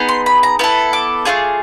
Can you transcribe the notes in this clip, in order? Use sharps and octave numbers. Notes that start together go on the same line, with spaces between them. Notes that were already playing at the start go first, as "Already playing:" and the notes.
Already playing: B3 D#4 G#4
C6
B5
A#5
B3 E4 A4
D6
A3 D4 F4 G#4